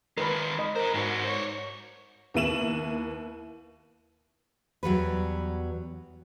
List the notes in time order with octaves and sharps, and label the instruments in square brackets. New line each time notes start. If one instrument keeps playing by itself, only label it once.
[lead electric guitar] D#3 G#3 [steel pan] A#4 B4 B5
[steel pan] D#5 B5
[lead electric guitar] G#4 C5 [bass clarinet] A#4
[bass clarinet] G#2 [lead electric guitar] G#3 F#4
[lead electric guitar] C5 C#5
[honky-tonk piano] D#2 B3 E4 D#7 E7 F#7
[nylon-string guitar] E2 F#3 G3 B4